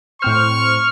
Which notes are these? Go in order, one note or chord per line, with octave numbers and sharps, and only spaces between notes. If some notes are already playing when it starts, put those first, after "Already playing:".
A2 C4 C5 C#6 F6